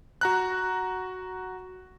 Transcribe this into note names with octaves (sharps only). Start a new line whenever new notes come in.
F#4 A#5 F#6